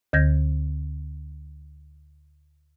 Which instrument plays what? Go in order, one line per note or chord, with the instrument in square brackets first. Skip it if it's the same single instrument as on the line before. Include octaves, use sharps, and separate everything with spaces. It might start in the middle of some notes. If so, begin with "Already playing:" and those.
[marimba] D2 D3 G6 G#6 A#6